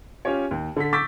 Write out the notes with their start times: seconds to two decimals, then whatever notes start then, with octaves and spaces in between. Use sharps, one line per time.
0.25 C#4 F4 G4 C#5
0.51 D#2
0.76 D3 A4 B6
0.93 C#6 D6 E6 G6 A6 B6